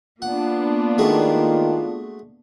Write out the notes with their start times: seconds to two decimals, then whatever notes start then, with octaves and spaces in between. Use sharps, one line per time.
0.22 A#3 B3 D4 F4 F#5
0.98 D#3 G#3 A3 F#4